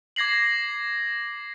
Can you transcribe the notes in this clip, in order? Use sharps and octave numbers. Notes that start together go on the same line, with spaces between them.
D6 G#6 A#6 C7 F#7